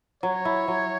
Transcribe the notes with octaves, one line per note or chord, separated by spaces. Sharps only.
F#3 C#5
E4
F#3